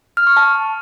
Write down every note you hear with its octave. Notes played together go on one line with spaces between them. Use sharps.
F6
C#6
A5